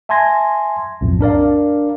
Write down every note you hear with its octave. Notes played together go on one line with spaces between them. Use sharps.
E5 G#5 A5 C6 G#6 A#6
B1 F2 A2
D4 A#4 D5 F5